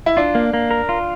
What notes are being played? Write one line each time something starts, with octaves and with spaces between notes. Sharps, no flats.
E4
D4 F4
A#3
A#3
A#4
F4